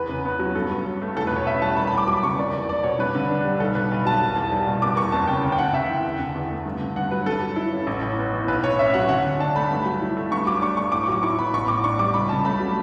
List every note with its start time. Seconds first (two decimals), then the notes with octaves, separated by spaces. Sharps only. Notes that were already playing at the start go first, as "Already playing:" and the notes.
Already playing: E2 B4
0.09 C#3
0.25 B3
0.39 F#3
0.55 G2 A4
0.70 F#3
0.85 C#4
1.02 A3
1.16 E2 A4
1.27 B4
1.31 B2
1.36 C#5
1.46 C#4 E5
1.62 G3 A5
1.77 E1 B5
1.87 B5
1.93 E2 D6
2.07 F#3 D6
2.23 C#3 C#6
2.38 F#1 D5
2.53 E2 D5
2.69 F#1 D5
2.83 B2 C#5
2.99 G2 B4
3.15 D3
3.29 D4
3.45 G3
3.60 B1 A4
3.75 B2 B4
3.91 B1
4.05 F#3 A5
4.21 E1
4.36 E2
4.52 G3
4.68 B2
4.82 F#1 D6
4.97 E2 C#6
5.12 F#1 A5
5.27 C#3 G5
5.43 D2
5.52 G5
5.59 C#3 F#5
5.73 D2 E5
5.89 E3
6.04 E2
6.19 D3
6.35 E2
6.50 A3
6.66 G2
6.81 D3
6.96 G2 F#5
7.11 F#3 B4
7.26 G2 A4
7.42 F#3
7.56 E4
7.73 C#4
7.87 A1
8.02 A2
8.18 B3
8.33 E3
8.48 B1 B4
8.63 A2 C#5
8.79 C#4 E5
8.94 F#3 F#5
9.09 D2 F#5
9.25 D3
9.39 D4 A5
9.56 A3 B5
9.71 G2
9.86 F#3
10.01 E4
10.17 A3
10.31 G2 C#6
10.47 F#3 D6
10.61 D4 C#6
10.77 A3 C#6
10.92 A2 D6
11.03 C#6
11.08 F#3 D6
11.23 E4 C#6
11.39 B3 B5
11.53 A1 C#6
11.68 A2 D6
11.83 D4 C#6
11.99 G3 D6
12.14 C#2 B5
12.29 C#3 A5
12.45 A3 B5
12.60 F#3